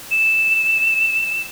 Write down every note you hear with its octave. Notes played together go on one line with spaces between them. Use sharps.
E7